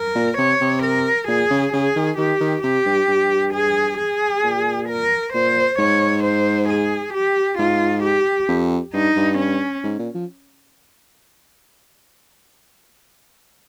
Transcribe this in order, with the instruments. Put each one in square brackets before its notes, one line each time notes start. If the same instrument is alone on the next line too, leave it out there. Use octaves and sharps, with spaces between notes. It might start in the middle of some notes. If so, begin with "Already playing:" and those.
Already playing: [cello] A#4
[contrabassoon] A#2
[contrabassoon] C3 [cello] C#5
[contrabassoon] C3
[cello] A#4
[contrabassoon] A#2 [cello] G#4
[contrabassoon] C#3
[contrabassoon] C#3 [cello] G#4
[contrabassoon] D#3
[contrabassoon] D#3 [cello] G4
[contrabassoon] D#3
[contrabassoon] C3 [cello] G4
[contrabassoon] G2
G2
[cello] G#4
G#4
[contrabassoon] A#2
[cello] A#4
[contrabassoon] A#2 [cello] C5
[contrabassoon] G#2 [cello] C#5
[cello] C5
G#4
G4
[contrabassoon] G#2 [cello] F4
[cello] G4
[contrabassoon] F2
[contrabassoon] G2 [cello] D#4
[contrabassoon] G2
[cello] C#4
[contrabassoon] G#2
A#2
F3